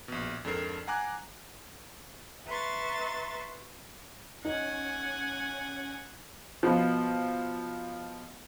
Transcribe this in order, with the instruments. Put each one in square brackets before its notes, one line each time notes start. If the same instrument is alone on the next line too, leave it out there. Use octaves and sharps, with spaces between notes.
[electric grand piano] A#1 B2
F2 G#2 D4 A4 A#4 C7
F#5 G#5 A#5 D6 F#6
[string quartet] B4 E5 A#5 C6 C#6 A6
[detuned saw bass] C#4 [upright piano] D#4 [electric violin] F#5 G#5
[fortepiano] B2 F3